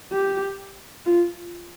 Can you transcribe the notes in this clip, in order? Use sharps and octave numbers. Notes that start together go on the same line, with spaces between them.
G4
F4